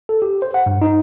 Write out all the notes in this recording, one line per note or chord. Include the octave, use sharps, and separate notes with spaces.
A4
G4
C5
F#5
G2
D#4